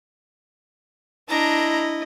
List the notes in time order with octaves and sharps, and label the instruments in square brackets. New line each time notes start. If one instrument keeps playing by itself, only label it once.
[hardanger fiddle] D4 A#5 [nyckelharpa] E4 D#5